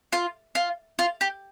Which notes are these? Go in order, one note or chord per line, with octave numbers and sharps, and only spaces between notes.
F4
F4
F4
G4